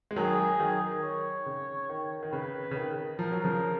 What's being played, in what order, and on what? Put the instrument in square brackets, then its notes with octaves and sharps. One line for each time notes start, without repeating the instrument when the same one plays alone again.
[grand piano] G#3
[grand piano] D#3 F#3 [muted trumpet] G#4
[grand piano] D#3 F#3
D#3
[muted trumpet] C#5
[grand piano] C#3
D#3
D#3
[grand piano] C#3 [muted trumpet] B4
[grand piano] C#3
D#3
[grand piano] F3 [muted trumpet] A#4
[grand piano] F#3
C#3 F3